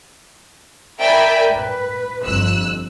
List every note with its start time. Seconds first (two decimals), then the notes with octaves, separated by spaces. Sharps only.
1.00 A#4 D5 E5 G5 G#5 B5
1.55 B4
2.25 G1 F2 E6 F#6